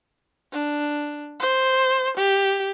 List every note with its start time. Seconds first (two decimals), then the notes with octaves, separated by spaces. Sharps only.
0.53 D4
1.40 C5
2.17 G4